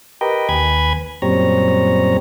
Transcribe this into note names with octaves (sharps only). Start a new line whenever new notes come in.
G4 A#4 B4 D#5 G5
D#2 B4 G#5 B5 G#6
F#2 A#2 G3 C4 C#5 A#5